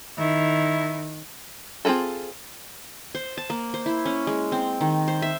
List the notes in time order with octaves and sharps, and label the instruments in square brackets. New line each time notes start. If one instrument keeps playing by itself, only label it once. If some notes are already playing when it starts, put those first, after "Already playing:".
[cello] D#3 [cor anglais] E4
[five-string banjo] C4 F4 F#4 G#4 A4
[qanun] C5
A5
A#3
C5
E4
C#4
G#3
C4
D#3
C5
E5